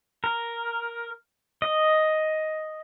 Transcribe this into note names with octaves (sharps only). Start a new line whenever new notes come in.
A#4
D#5